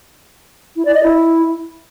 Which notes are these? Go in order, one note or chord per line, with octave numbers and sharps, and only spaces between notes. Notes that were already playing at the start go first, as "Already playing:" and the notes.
E4
D5
D#5
E4